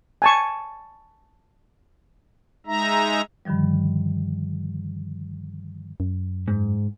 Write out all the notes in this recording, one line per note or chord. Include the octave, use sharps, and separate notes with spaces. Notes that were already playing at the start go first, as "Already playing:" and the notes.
G#5 A5 C#6
G#3 D#4 E5 A#5
G2 D3 D#3 F3 G3
F#2
G#2